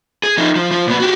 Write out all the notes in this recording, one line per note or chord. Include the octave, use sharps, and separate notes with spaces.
G#4
F3 D#4
F3
F3
A#2 B3
F#4 G4